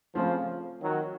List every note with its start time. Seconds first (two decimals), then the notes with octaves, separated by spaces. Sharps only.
0.15 C#3 F3 A3 C4 F4 C5
0.82 D#3 F#3